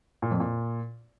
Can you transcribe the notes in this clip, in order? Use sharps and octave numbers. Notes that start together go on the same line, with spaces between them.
A#2
F2
A#2